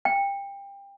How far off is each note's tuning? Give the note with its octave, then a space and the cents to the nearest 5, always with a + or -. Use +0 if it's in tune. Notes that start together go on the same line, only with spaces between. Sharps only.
G5 +25